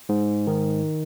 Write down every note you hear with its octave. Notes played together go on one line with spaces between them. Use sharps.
G#2
D#3